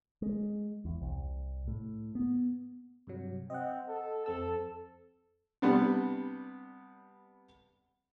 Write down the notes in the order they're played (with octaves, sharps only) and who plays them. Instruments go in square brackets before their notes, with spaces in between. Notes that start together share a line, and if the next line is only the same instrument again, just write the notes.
[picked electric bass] G#3
E2
C2
A2
B3
[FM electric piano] G2 C3 F#3
[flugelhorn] C4 [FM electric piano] D#5 F#5
[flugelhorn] A4
[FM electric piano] F2 C4 E6 [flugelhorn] A4
[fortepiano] C3 G3 B3 D4